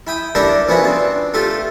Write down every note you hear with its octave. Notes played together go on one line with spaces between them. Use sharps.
E4 G5 D#6
D4 E4 G4 A4 A#4 D5
F3 B3 C#4 E4 F#4
C4 D4
A3 F4 G4 A4